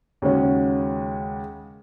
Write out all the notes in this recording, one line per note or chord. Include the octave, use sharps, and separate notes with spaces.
D#2 C#3 G#3 C#4 F#4